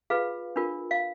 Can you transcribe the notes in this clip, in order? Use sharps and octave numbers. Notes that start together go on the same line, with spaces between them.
F4 G#4 B4 F5
D4 F4 A#4
F5